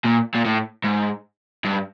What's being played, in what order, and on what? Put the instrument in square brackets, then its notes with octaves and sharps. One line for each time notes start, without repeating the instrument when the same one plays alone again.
[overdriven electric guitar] A#2
A#2
A2
G#2
G2